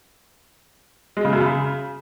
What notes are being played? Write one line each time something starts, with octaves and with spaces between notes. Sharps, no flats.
G#3
C#3
F#2
C#3